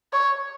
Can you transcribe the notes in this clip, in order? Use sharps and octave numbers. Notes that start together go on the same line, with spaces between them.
C#5